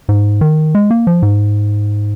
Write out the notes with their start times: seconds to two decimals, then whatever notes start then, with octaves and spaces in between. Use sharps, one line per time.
0.09 G#2
0.41 D#3
0.75 G#3
0.90 A#3
1.07 F3
1.22 G#2